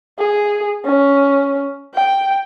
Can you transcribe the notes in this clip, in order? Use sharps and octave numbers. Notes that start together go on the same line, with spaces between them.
G#4
C#4
G5